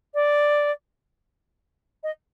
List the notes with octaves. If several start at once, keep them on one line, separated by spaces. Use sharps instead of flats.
D5
D#5